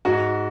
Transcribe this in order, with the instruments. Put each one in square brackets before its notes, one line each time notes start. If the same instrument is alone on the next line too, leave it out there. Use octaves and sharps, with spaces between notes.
[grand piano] G#2 F#4